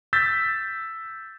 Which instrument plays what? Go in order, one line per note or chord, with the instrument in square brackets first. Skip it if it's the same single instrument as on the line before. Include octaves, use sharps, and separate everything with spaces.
[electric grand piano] E6 G6 A6 B6